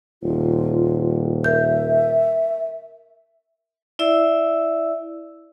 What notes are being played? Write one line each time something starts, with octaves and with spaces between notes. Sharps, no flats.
D#1 F4
A#4 E5 G6
E4 D5 E5 E6